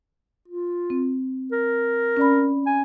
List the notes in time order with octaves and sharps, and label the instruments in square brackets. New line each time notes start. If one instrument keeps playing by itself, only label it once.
[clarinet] F4
[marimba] C4
[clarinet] A#4
[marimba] C#4 D5 B5
[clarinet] G#5